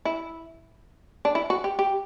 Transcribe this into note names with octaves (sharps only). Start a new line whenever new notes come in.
E4
D4
E4
F#4
G4
G4